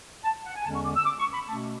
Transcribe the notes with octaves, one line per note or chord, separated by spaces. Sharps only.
A5
F#5
G#5
E2 D3 G#3 C#4 A5
C#6
D6
E6
D6
C#6
B5
B2 A3 C#4 A5